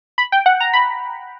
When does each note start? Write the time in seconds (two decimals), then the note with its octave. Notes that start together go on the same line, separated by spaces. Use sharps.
0.18 B5
0.32 G5
0.46 F#5
0.60 A#5
0.73 B5